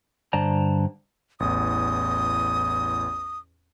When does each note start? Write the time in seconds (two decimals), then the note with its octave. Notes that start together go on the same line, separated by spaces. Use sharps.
0.33 G2 D3 C5 D5 A5 A#5
1.40 A1 E2 D#6